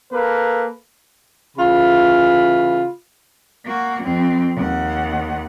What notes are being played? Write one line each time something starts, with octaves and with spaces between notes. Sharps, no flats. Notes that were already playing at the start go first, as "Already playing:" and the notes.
A#3 A4 B4
C#3 E3 A3 F4 B5
A#3 F#4
F2 C4
D#2 F#5